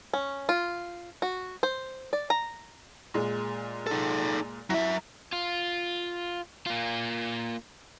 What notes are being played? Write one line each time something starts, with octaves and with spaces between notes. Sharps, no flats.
C#4
F4
F#4
C5
D5
A#5
A#2 G#3
D#4 A4
F#3 E4 E5
F4
A#3 F4